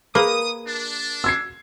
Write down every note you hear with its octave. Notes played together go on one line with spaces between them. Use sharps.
A#3 G#4 A#4 B4 D#6
D4
E6 G#6 C7